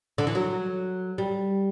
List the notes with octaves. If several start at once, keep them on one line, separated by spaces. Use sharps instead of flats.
D3
E3
F#3
G3